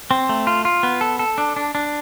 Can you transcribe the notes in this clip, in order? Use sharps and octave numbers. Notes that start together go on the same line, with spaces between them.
C4
A3
F4
F4
B3
A4
A4
D4
D4
D4